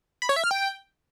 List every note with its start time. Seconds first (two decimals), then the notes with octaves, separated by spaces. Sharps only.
0.22 B5
0.29 C#5
0.36 E5
0.44 F6
0.51 G5